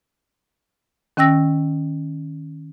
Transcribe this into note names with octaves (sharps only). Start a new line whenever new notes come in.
D#3 C#4 G5 E6 A#6